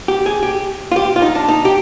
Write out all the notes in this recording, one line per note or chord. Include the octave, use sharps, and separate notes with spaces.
G4
G#4
G4
F4
G4
F4
D#4
D4
D#4
G4